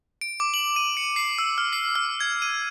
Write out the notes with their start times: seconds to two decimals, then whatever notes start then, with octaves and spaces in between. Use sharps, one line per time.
0.21 D7
0.40 D6
0.54 F#7
0.76 D#7
0.97 C#7
1.16 C7
1.38 E6
1.58 F6
1.73 C7
1.95 F6
2.20 G#6
2.42 D#7